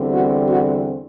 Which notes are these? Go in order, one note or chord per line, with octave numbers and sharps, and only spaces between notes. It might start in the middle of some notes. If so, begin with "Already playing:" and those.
Already playing: E2 D3 G3 C4
F#4
F#4